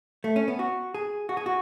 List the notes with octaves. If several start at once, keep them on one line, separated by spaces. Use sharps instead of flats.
A3
C#4
B3
F#4
G#4
F#4
G#4
F#4